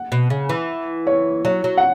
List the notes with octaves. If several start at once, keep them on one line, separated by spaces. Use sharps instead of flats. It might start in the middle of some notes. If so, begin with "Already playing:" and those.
Already playing: F#5
B2
C#3
E3
C#5
F#3 C#5
F#3
F#5